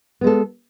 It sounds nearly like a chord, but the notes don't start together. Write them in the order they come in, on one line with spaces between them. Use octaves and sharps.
B3 G#3 A4